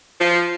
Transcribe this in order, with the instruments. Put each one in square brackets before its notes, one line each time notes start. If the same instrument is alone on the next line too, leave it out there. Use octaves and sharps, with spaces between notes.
[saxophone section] F3